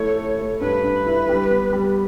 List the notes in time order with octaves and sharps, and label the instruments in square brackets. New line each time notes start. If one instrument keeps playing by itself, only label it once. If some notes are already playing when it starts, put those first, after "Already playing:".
Already playing: [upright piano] A3 E4 [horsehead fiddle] C#5
[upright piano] A4
A3
[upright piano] G2 [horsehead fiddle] B4
[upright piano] G2
E4
G3
B3
G3